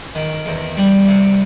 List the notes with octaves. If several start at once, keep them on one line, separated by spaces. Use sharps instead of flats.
D#3
E2
G3
C3